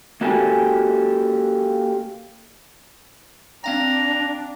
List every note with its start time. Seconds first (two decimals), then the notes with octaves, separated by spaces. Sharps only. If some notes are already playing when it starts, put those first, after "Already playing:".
0.21 A#3 F#4 G4 A4 A#4 G#5
3.64 C4 D4 F5 G5 A#5